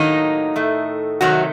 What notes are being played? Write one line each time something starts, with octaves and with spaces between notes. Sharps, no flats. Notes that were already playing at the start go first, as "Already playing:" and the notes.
Already playing: A2 D#3 F#3 A#3 D#4
A2 A3
C3 D#3 F#3 A3 F#4